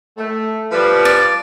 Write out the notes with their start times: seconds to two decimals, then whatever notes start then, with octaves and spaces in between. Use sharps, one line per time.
0.17 A3
0.72 F3 G3 B4
1.05 D5